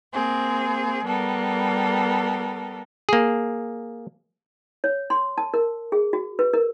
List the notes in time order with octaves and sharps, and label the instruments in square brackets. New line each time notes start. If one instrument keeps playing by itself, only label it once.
[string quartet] A#3 C4 G#4
G3 B3 A4 A#4
[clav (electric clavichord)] A#3 G#4
[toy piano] C#5
C6
A5
A#4
G#4
F#4
B4
A#4